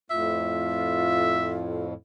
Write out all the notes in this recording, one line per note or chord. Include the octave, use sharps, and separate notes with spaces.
F2 A2 F4 E5